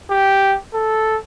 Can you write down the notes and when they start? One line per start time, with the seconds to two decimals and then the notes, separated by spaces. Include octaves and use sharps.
0.10 G4
0.74 A4